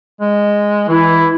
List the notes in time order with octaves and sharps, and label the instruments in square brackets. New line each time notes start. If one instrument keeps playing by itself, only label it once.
[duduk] G#3
[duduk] E3 [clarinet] E4